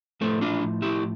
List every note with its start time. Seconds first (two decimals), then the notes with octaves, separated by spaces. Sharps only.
0.21 A2 F3 A3 C4
0.41 D4 F4
0.82 E4 G4